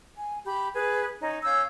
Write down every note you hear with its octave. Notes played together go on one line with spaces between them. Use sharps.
G#5
G4 B5 G6
G#4 B4
C#4 D#4
C#4 F5 E6 G6